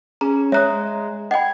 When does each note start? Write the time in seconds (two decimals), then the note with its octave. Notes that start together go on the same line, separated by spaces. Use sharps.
0.21 C#4 G#4 A#5
0.52 G#3 C#5 E5 A#5 D#6 F#6
1.31 D#5 F#5 G5 B5 G#6